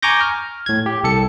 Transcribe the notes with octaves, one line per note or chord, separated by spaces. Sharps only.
G#5 A#5 C#6 D6 G6 A#6
F6
A2 G#6
G4
C2 A4 C#7